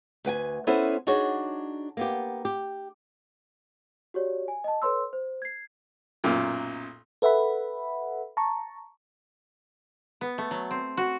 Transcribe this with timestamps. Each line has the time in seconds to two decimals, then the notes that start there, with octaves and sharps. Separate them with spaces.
0.25 D2 B4 G5 G#5
0.67 B3 C#4 E4 A4 C5
1.07 D4 D#4 F#4 G#4 C#5
1.97 A#3 B3 G4
2.45 G4
4.14 F#4 G4 C#5 D5
4.48 G#5
4.64 D#5 A5
4.82 A4 B4 C#5 C6 E6
5.13 C5
5.42 G#6 C7
6.24 B1 F#2 A#2
7.22 A4 B4 E5 F#5 B5
8.37 A5 A#5 C#6
10.21 B3
10.38 A3
10.51 F#3
10.71 C4
10.97 F#4